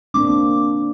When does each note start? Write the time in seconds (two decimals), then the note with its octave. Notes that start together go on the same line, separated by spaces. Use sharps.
0.14 A#3 C4 D4 D6